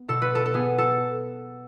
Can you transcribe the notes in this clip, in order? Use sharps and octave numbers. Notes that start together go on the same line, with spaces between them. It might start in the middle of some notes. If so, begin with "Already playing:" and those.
Already playing: B3
B2 A4
B4
A4
A4
B3 G#4
A4